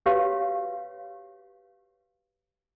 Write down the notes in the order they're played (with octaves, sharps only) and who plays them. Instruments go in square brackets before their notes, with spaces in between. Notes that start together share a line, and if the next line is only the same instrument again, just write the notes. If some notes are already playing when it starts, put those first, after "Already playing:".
[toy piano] F#4 G4 B4 C#5 F5